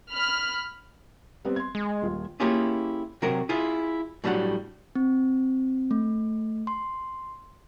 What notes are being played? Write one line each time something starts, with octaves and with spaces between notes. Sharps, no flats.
B5 F6
G3 B3 C4
C6 G#6
G#3
D#1 F4
A#3 C#4 E4 F4 G4 G#4
C3 F#3 F#4 A#4
E4 F4 G#4
A2 F#3 G3 D4 F#5
C4
A3
C6